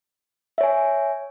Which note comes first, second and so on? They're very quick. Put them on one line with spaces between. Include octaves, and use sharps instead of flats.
E5 C#5 G#5